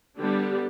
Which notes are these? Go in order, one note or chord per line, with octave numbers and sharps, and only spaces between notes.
D3 G3 B3 D4 G4